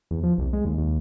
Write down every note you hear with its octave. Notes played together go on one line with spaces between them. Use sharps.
E2
F3
C2
G#3
D#2
D#2